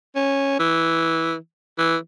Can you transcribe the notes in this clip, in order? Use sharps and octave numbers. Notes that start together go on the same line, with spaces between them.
C#4
E3
E3